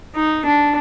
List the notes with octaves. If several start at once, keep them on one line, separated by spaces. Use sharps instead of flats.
D#4
D4